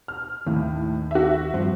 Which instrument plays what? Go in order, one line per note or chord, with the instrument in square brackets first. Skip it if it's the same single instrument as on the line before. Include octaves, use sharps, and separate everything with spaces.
[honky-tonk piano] F6
[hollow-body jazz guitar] D#2 [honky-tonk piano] A2
[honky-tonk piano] F#4 E5
[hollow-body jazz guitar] G2 F3 C4